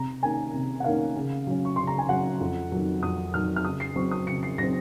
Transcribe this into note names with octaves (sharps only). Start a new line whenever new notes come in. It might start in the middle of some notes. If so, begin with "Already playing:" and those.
Already playing: C3 A#5
D#3 A#3 C#4 G#5
C3
F#5
D#3 A#3 C#4 F5
C#3
F#3 C#4
C#6
C#3 C6
A#5
G#5
F#3 C#4 F#5
F2
D#3 F#3
F2 D#6
D#3 F#3 F6
F6
C#3 D#6
C7
F#3 C4 C#6
D#6
C#3 C#7
C7
F#3 C4 A#6